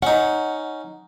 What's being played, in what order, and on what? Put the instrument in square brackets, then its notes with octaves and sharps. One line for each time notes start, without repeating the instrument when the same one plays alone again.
[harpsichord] C#4 D#4 [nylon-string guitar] F#5